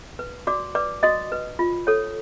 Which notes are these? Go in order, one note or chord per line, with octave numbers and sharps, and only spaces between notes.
B4
F#4 D5 D6
B4 D5 D6
F#4 D#5 D#6
B4
F4
A4 C#5